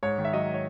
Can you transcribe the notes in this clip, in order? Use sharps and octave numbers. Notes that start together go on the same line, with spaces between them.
G#2 C#5
D#3
E5
F#3 D#5
C#5